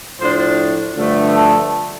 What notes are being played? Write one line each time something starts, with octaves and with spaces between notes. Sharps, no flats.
A2 F3 D4 C5
G2 D3 F3 A3
A4